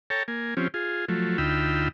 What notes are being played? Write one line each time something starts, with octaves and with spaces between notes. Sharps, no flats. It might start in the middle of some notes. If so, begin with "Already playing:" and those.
A4 C#5 G5 A5 A#5
A#3 G#5
F3 C4 C#4 G4
F4 G#4
F3 F#3 A3
D2 D#4 F4 G5 B5 E6